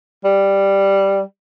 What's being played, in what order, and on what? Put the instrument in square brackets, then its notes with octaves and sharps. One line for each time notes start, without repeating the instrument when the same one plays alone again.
[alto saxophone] G3